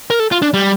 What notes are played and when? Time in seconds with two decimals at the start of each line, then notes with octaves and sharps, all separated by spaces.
0.10 A#4
0.20 A4
0.32 F4
0.42 D4
0.54 G3